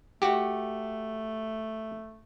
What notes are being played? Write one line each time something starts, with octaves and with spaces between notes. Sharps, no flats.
A3 F#4 G4